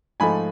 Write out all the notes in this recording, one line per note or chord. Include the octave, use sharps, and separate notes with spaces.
G#2 F3 A3 G#5 B5